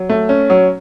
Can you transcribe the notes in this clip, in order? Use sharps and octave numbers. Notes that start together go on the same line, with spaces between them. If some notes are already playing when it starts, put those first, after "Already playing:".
Already playing: F#3
A3
C#4
F#3